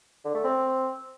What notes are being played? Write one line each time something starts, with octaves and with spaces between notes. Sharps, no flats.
D3
A3
C4